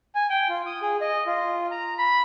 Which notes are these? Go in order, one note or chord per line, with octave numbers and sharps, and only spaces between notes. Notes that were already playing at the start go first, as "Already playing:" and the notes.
G#5
G5
F4
D#6
G#4
D#5
F4
A#5
B5